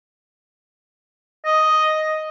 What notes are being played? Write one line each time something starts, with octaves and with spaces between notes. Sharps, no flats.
D#5